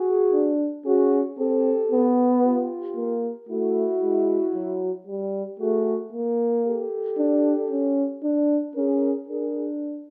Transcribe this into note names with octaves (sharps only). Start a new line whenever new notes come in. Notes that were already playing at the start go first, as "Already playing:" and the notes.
Already playing: F#4 G#4
D4
C#4 F#4 G#4
C4 G4 A4
B3
F4 G4
A#3
A3 E4 F#4
G#3
F#3
G3
A3 F#4 G#4
A#3
G4 A4
D4
C#4
D4
C#4 G#4 A#4
D4 G#4 A#4